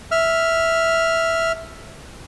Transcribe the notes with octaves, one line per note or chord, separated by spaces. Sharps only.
E5 F6